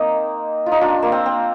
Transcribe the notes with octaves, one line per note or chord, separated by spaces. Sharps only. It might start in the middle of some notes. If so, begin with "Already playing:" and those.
Already playing: A#3 C4 D#4
F4
D#4
D4 F4
A#3
C4
C4